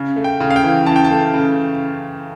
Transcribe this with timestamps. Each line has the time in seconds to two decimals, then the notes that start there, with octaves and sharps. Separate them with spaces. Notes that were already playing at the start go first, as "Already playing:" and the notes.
Already playing: C#3
0.16 A3
0.24 G5
0.40 C#3
0.50 F5
0.56 G5
0.63 E3
0.86 C#3 A5
0.96 G5
1.05 A5
1.11 A3
1.34 C#3